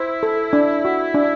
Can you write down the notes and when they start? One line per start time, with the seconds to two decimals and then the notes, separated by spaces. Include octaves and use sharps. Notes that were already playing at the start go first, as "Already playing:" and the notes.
Already playing: E4 C5
0.23 A4
0.53 D4
0.85 F#4
1.14 D4